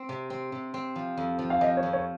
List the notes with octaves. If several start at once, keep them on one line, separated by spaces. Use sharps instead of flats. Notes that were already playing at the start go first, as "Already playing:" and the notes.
Already playing: C4
C3
C4
C3
C4
F3
F2
F3
F5
F3 D#5
C#5
F2
C#5